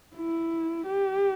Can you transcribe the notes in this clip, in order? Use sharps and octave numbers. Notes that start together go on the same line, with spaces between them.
E4
G4